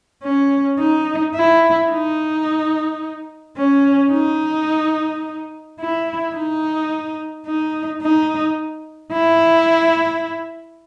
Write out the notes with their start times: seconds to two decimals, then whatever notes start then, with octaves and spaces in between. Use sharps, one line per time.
0.24 C#4
0.79 D#4
1.35 E4
1.90 D#4
3.57 C#4
4.12 D#4
5.80 E4
6.36 D#4
7.47 D#4
8.02 D#4
9.13 E4